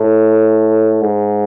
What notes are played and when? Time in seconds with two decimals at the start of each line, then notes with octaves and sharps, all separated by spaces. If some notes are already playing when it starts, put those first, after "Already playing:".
Already playing: A2
1.02 G#2